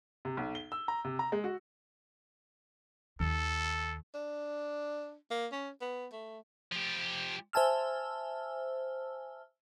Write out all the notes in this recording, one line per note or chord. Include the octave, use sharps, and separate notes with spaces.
C3
B1
G7
E6
A#5
C3
A#5
G#3
F#4
D#2 D#3 A4
D4
A#3
C#4
B3
A3
F3 G4
C5 E5 G#5 A5 E6 F6